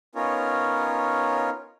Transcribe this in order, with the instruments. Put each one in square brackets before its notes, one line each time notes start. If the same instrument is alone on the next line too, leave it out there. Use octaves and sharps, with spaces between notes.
[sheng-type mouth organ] B3 C#4 D#4 F4 A#4 C#5